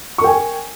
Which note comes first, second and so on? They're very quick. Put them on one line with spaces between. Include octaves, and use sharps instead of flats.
C#6 A#4 G5 G#5